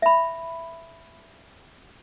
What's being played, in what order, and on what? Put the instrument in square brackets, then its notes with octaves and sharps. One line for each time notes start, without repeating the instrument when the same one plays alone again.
[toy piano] E5 B5